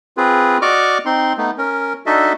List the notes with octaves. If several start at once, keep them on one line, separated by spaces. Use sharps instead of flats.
C4 F4 G#4 B4
F#4 D5 D#5 C#6 D6 F6
C4 D#4 C6
A3 B3 D#4
C#4 A#4
D4 D#4 F#4 A4 D#5 E5